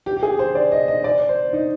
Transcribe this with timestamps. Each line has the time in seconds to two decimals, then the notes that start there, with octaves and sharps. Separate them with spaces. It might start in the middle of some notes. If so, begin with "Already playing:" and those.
0.06 G4
0.17 G4
0.23 G#4
0.39 C5
0.55 D5
0.72 D#5
0.88 D#5
1.04 D5
1.29 C5
1.53 D#4